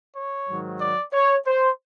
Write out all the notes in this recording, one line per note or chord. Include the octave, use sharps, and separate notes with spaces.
C#5
G#2 D#3 F#3
D5
C#5
C5